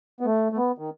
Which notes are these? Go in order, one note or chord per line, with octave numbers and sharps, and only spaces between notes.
B3
A3
A3
B3
D#3